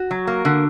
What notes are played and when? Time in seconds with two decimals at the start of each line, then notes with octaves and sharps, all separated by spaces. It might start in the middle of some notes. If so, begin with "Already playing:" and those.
Already playing: F#4
0.11 F#3
0.27 A#3
0.45 D3